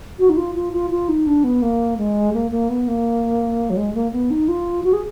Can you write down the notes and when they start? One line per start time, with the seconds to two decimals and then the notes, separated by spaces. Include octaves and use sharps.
0.19 F#4
0.29 D#4
0.37 F4
0.55 F4
0.73 F4
0.91 F4
1.09 D#4
1.27 D4
1.44 B3
1.62 A#3
1.98 G#3
2.34 A#3
2.51 A#3
2.69 B3
2.88 A#3
3.70 F#3
3.77 G#3
3.95 A#3
4.12 B3
4.31 D#4
4.48 F4
4.84 F#4
4.93 G#4